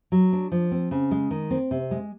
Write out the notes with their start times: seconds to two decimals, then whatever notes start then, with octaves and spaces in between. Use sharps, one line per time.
0.12 F#3
0.33 D4
0.52 F3
0.72 C4
0.91 C#3
1.11 G#3
1.31 D#3
1.51 C4
1.71 C3
1.91 G#3